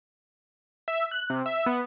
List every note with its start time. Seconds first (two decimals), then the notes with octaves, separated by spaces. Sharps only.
0.88 E5
1.11 F#6
1.30 C3
1.46 E5
1.66 B3